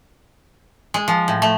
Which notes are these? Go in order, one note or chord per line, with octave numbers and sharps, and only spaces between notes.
G#3
F3
A2
A3